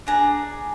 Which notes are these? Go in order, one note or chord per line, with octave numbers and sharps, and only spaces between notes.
D4 G#4 A#5